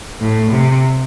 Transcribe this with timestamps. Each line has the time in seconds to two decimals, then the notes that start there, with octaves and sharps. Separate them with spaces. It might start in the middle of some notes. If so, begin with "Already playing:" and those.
0.20 A2
0.52 C3